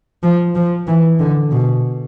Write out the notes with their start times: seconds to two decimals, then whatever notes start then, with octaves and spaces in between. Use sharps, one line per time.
0.23 F3
0.55 F3
0.87 E3
1.20 D3
1.52 B2